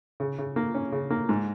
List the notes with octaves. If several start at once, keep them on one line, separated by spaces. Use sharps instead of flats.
C#3
C#3
A#3
C#4
C#3
A#3
G#2